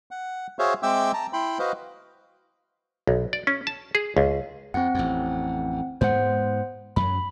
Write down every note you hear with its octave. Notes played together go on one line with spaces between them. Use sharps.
F#5
F#4 G#4 C5 C#5 E5 F5
G#3 C4 E5 G5 D6 E6
A5 A#5
E4 G5 B5 C6
F#4 B4 C5 D#5 F5
B1
D5
C#4
A5
G#4
C#2
F2 C4 F#5
A1 F2
G#2 G#3 B3 C5 F#5
F#2 F#3 B5